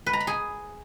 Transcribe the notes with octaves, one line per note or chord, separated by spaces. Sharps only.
B4
A#5
B5
G#4